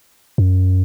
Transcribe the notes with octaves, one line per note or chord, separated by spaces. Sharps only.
F#2